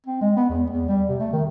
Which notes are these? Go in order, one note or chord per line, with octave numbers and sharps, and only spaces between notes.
C4
G#3
B3
E2
E2
G3
C3
A3
D#3